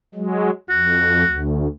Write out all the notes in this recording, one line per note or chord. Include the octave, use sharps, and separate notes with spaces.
F#3 G#3
F2 F#4
D2